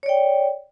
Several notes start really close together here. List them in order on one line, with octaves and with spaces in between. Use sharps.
C#5 D5 G5